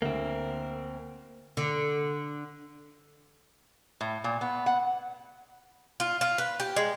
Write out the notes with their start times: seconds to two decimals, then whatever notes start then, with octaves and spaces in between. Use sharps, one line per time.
0.02 D2 A#3 C4 A#4
1.57 D3
4.01 A2
4.24 A#2
4.41 B3
4.66 F#5
6.00 F4
6.21 F4
6.38 B4
6.60 G4
6.76 G#3